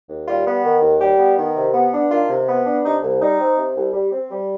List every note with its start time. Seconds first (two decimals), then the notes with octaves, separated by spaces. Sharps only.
0.10 D#2
0.27 G3 F4
0.46 B3
0.64 D#3
0.82 D#2
1.00 G3 G4
1.19 B3
1.37 D#3
1.56 C3
1.73 B3
1.92 D4
2.10 D#3 F4
2.29 C3
2.48 B3
2.66 D4
2.83 C3 D#4
3.02 C2
3.20 G3 D#4
3.39 C4
3.57 C3
3.75 C2
3.93 G3
4.12 C4
4.30 G3